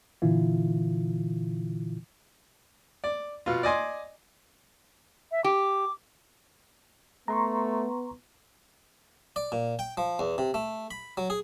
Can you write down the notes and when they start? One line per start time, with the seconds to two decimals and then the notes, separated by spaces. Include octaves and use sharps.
0.22 A#2 D3 E3 E4 F4
3.04 D5
3.46 B2 F4
3.63 D5 D#5 G#5 C6
5.32 E5
5.44 G4 D6
7.28 A3 B3 A#5 C6 C#6
9.36 D5
9.52 A#2
9.79 G5
9.97 F3
10.19 E2
10.38 C3
10.54 A3
10.91 B5
11.17 F#3
11.30 G#4